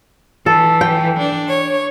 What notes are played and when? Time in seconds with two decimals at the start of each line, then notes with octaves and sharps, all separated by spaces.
0.46 E3 A4
0.81 G5
1.19 D4
1.49 C#5